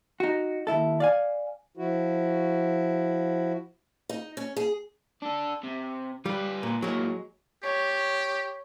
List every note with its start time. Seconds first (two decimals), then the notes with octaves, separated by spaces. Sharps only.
0.20 D#4 F#4
0.67 D#2 G#2 E4 A4
1.00 D5 F5 G#5
1.77 F3 E4 F#4
4.09 D#4
4.37 C#4
4.57 G#4
5.22 D4 A4
5.64 C3
6.26 G3 F4 B4
6.63 A#2
6.82 A2 F#3 G#3 A#3
7.63 G4 C#5